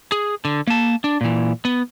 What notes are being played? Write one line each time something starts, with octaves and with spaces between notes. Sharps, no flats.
G#4
D3
A#3 A5
D4
A#2 E3
B3